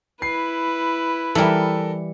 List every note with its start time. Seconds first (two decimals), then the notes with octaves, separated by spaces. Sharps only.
0.22 E4 B4 C7
1.35 E3 G3 A4 A#4 E5